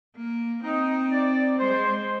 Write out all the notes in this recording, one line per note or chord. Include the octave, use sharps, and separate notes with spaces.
A#3
C4 D#4
D5
G#3 C5